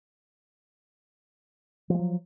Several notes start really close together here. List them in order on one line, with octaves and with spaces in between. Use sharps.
F3 G#3 F#3